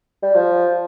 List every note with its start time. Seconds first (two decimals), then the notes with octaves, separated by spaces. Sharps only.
0.23 G3
0.35 F3